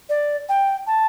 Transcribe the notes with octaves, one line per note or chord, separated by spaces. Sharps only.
D5
G5
A5